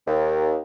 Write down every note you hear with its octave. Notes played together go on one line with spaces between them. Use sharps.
D#2